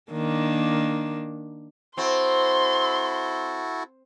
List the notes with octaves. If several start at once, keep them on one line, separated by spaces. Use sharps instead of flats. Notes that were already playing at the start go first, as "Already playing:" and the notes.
D#3 A#3 D4
C4 E4 F#4 A4 C6